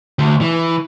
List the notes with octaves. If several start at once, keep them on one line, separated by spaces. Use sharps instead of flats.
D2
E3